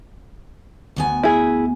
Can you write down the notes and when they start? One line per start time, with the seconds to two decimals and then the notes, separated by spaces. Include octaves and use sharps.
0.96 D2 B3 G#5
1.23 E4 G#4